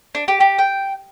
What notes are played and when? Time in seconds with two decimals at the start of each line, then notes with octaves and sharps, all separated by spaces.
0.15 D4
0.28 G4
0.40 G4
0.59 G5